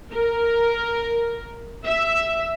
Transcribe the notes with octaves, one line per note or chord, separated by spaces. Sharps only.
A#4
E5